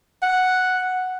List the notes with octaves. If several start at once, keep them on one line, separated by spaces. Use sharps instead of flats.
F#5